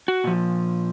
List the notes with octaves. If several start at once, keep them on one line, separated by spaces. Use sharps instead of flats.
F#4
A#2 F3